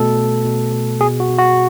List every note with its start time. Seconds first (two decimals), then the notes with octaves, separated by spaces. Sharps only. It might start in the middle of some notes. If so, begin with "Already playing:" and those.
Already playing: B2 A3 A4
0.16 B2
0.45 B2
0.72 B2
1.01 B2 G#4
1.20 F#4
1.29 B2
1.39 F#4